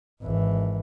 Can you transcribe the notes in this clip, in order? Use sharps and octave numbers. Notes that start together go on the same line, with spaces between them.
G#1 E3